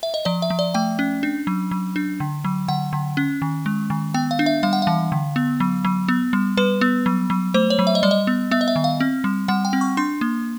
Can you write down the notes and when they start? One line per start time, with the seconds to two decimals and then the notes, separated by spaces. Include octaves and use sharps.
0.03 E5
0.14 D#5
0.25 F3 D5
0.42 E5
0.50 F3
0.59 D5
0.74 A3 G5
0.99 C#4
1.23 D4
1.47 F#3
1.71 F#3
1.96 D4
2.20 D3
2.44 F#3
2.68 D3 F#5
2.93 D3
3.17 C#4
3.42 D#3
3.66 G#3
3.90 D#3
4.14 B3 G5
4.31 F5
4.39 D4
4.46 E5
4.63 G3 F5
4.73 F#5
4.82 E3 F5
5.12 D3
5.36 B3
5.60 F#3
5.85 F#3
6.08 B3
6.33 G3
6.57 G3 B4
6.81 B3
7.06 F#3
7.30 F#3
7.54 A3 C5
7.70 C#5
7.79 F#3
7.87 E5
7.95 D#5
8.03 G3 D5
8.11 D#5
8.27 B3
8.51 B3 E5
8.61 D#5
8.68 E5
8.76 D#3
8.84 F5
9.00 C4
9.24 G3
9.48 G3 F#5
9.65 G5
9.73 C4
9.81 C#6
9.97 D4 C6
10.21 A#3